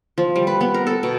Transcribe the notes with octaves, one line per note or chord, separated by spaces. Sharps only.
F3
G3
B4
B3
A#4
A4
B2